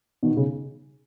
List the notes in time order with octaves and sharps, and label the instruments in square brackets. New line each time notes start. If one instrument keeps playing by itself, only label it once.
[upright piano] B2 D#3
C#3